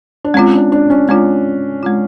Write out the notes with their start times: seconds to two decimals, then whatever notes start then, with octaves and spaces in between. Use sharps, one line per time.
0.24 D4
0.34 G#3 C4 C#4 F4
0.54 D4
0.72 D4
0.90 C#4
1.09 G#3 C4 C#4 F4
1.83 G#3 C4 F4